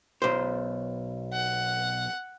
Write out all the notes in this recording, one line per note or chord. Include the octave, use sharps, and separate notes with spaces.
B1 C5
F#5